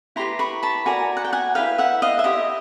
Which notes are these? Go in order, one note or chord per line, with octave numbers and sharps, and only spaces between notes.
E4 G4 B4 A#5 C6
B5 C#6
A5 B5
F#4 A#4 D5 G#5 A#5
F#5
G5
F#5 G#5
E4 G#4 B4 F5 G5
E5 F#5
D#5 F5
E5
E4 G4 C5 D#5